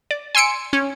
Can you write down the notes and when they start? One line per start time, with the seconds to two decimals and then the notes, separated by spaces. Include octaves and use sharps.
0.11 D5
0.35 G#5 C6 E6 C#7 D7
0.73 C#4